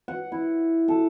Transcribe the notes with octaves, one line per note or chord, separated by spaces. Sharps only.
F#5
E4
A4